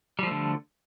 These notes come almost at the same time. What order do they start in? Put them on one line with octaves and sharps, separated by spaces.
G3 F3 A3 D3